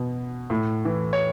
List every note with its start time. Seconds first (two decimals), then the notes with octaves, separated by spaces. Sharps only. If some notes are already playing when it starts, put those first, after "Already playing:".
Already playing: B2
0.50 A2
0.85 E3
1.13 C#5